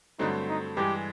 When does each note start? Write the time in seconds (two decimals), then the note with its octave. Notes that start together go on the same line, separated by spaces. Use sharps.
0.19 G2 D3 F#3 A3 C4 D#4
0.49 D#4
0.77 G2 E3 G#3 G4